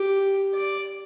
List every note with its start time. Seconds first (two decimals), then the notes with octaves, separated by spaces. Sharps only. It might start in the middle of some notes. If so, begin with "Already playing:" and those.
Already playing: G4
0.54 D5